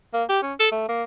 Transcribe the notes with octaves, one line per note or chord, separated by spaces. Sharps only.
A#3
G4
C#4
A4
A3
A#3